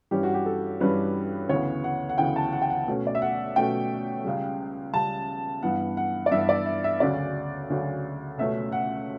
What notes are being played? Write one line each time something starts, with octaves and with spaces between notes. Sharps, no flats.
G2 E3 G3 C#4 G4
F#4
G4
A4
G2 E3 G3 C#4 B4
D2 C#3 E3 B3 C#5
F#5
F#5
D2 C#3 E3 B3 G5
A5
F#5
G5
F#5
B2 A3 C#4
D5
E5
F#5
B2 A3 C#4 G5
C#2 C#3 G3
C#2 C#3 G3 A5
G2 E3 B3 F#5
F#5
D5
G2 E3 B3 E5
D5
E5
E5
D2 C#3 F#3 C#4 D5
D2 C#3 F#3 C#4
C#2 B2 A3 C#4 E5
F#5